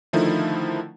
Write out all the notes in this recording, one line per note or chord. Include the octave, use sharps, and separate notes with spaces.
D3 D#3 F3 A3 D#4 E4